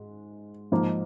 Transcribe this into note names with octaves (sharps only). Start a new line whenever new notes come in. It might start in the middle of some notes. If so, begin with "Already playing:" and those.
Already playing: G#2 G#3
G#2 F3 A#3 D#4